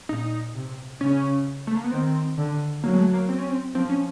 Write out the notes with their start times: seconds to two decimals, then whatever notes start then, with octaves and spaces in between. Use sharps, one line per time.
0.09 A#2 D#4
0.55 C3
1.00 C#3 C#4
1.67 A3
1.75 A#3
1.84 B3
1.91 D#3 C4
2.37 D3
2.83 F#3 A#3
2.94 G#3
2.98 A3
3.13 A#3
3.29 C4
3.38 C#4
3.49 C4
3.74 F3 C4
3.90 C#4